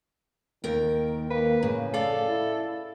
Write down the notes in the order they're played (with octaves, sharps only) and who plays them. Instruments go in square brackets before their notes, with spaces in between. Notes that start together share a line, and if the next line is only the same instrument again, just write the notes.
[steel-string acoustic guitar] D#2 A#4 G5 [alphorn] D#3
[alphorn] A#3 [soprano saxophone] B4
[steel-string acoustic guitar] A2 [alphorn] C#3
[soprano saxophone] A4 [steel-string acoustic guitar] D5 F5
[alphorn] E4